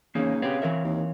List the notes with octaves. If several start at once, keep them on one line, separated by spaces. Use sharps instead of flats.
E2 C#3 A#3 C#4 D#4
B3 C4 G4 C#5 F5
E3 A#4 E5
D#2